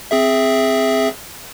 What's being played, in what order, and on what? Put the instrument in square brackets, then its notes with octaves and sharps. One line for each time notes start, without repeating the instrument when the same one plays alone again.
[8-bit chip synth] C4 G#4 E5